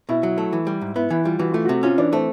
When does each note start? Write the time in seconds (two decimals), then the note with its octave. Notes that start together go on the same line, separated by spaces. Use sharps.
0.09 B2 E4
0.23 F#3
0.38 A3
0.53 E3
0.67 G3
0.81 G#2
0.95 B3 E4
1.10 E3 E4
1.24 G3 F4
1.39 E3 F#4
1.52 A3 F4
1.65 C3 F#4
1.83 C#4 F4
1.98 E3 D4
2.13 A3 C4